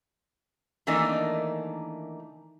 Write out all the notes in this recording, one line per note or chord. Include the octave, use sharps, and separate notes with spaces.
D#3 E3 A3 A#3 D4 D#4